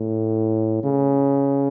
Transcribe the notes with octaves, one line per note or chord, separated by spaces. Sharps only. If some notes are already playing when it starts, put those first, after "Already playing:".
Already playing: A2
C#3